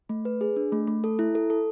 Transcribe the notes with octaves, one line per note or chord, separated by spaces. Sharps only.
A3
B4
G#4
D4
A3
A3
A4
E4
A4
A4